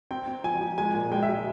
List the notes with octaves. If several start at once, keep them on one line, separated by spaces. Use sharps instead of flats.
C4 G5
C4
F3 G#5
F3
G#3 G#5
A#2
G#3 G5
E5
G#3